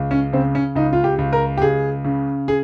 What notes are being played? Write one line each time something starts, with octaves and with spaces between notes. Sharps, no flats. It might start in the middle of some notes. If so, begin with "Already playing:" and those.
Already playing: C#2
C#4
C#3 C4
C#4
C#2 D#4
F4
G4
C#2
A#4
G4
C#2 G#4
C#3
G#4